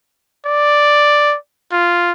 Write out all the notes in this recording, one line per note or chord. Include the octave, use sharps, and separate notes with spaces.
D5
F4